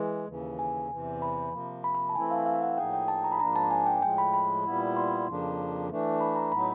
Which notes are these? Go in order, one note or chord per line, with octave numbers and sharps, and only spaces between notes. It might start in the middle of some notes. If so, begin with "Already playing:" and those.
Already playing: E3 G#3
D#2 C#3 E3
G#5
E2 C3 E3
B5
C3 F3 A#3
B5
B5
A5
E3 A3 C4 E4 G#5
F5
F5
F#5
A2 F3 A#3 D#4 G#4 G5
G5
A5
A#5
B5
G#2 F3 A#3 D4 A#5
A5
G#5
G5
A2 F3 G#3 G5
B5
B5
A#2 G3 B3 E4
C6
F2 C#3 F3 A#3 D4
E3 A3 D4
B5
A#5
A2 F#3 B3 D#4 B5